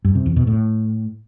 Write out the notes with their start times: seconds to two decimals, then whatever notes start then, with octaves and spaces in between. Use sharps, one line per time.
0.05 G2
0.15 C3
0.26 E2
0.36 B2
0.47 A2